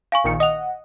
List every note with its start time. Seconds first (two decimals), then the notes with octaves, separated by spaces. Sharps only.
0.12 F5 G#5 C#6
0.24 A#1 D#3 C#7
0.40 D#5 F#5 D#6 F7